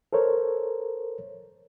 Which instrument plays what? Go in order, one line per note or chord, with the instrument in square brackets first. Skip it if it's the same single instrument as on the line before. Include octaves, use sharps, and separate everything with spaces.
[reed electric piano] A4 A#4 C5 C#5